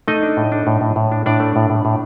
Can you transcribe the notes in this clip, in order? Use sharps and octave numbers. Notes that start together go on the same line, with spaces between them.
A3 D#4 D#5
D4
A2
D4
A2
A2
A2
D4
A2 D4 D5
A3
A2
A2
A2